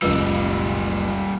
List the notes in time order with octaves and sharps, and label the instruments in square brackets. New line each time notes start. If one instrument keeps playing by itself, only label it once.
[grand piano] F#1 C#2 E6 [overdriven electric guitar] G3 A#3